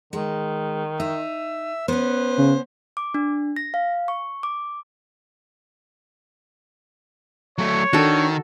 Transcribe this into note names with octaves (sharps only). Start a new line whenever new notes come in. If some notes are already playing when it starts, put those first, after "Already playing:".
D#3 G#3
D#4 E5
B3 C#4 B4 C5
C#3
D6
D4
A#6
F5
C#6
D6
F#3 A3 C#5
D#3 D4 F#4 A4